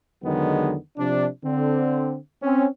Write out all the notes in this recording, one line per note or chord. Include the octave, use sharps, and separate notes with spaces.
E2 D3 D#3 F#3 G#3 B3
C3 F3 D4
D3 C4
C4 C#4